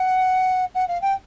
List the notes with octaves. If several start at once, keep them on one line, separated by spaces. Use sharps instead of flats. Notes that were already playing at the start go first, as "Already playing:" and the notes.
Already playing: F#5
F#5
F5
G5